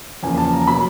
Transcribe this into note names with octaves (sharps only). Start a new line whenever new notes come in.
E2 C#3 F3 A#3 G#5
A5
A#5
B2 F#3 A#3 B5